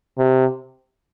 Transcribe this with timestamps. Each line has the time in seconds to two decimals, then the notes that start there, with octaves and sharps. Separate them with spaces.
0.18 C3